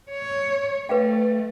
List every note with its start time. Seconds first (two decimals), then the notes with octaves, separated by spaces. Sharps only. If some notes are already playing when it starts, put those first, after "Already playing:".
0.11 C#5
0.89 A3 B4 F5 G5